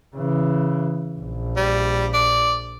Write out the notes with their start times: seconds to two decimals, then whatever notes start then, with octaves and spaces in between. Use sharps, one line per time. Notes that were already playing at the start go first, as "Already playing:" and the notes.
0.15 C#3 E3
1.19 A#1
1.57 G3
2.14 D5